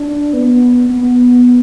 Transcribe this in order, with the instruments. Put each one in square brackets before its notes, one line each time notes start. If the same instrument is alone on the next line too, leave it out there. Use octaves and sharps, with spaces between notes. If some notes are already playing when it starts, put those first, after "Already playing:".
Already playing: [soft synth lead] D4
B3
B3